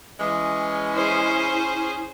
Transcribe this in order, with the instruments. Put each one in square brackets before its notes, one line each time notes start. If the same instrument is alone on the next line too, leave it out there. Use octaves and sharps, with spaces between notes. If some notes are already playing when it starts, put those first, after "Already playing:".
[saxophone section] E3 G#3 [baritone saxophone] C#4
[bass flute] E4 [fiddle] G#4 C5